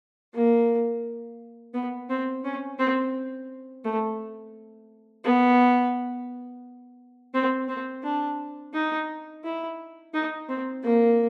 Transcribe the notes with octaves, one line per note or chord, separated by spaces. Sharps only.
A#3
B3
C4
C#4
C4
A3
B3
C4
C4
D4
D#4
E4
D#4
C4
A#3